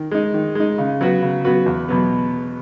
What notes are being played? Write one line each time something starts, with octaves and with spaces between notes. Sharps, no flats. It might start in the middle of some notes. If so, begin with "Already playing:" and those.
Already playing: D#3
G#3 D#4
D#3
G#3 D#4
C#3
F#3 B3 F#4 B4
C#3
F#3 B3 F#4 B4
E2
B2 F#3 B3